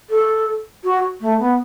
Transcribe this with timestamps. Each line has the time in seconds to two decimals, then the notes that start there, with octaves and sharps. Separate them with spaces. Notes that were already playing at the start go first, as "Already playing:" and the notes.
0.10 A4
0.84 F#4
1.21 A3
1.39 B3